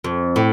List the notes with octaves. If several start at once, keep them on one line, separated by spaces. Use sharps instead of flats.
F2
A2